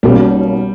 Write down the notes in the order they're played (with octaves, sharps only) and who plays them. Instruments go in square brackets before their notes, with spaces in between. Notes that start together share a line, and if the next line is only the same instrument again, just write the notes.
[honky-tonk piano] B1 B2 A#3 C#4 [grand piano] G3